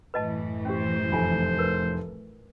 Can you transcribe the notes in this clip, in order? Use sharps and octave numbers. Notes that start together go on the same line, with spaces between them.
F#2 A2 E3 B4 D#5 A5
C#4 G4 C5
F1 F4 G#5
A#4 B4